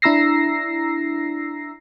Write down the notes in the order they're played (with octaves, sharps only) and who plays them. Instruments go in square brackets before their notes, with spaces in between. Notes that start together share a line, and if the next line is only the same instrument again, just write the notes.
[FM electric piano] D4 E4 A#5 E6 A#6 C7